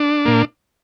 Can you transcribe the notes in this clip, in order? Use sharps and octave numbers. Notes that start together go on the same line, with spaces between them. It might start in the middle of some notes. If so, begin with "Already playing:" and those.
Already playing: D4
A#2 A#3